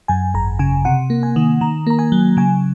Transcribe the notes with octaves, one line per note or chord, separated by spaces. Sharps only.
F#2 G#5
G#1 A#5
C#3 G#5
C3 F#5
A#3
G#5
D#3
D#3 A#5
A#3 A#5
G#5
F#3
C#3 G#5